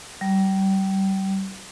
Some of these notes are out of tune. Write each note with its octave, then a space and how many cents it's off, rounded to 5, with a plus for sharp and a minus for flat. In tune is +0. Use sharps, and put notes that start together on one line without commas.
G3 -30